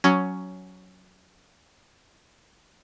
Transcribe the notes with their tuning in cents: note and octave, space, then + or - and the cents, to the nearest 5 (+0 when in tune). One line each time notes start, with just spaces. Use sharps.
F#3 +0 C#4 +10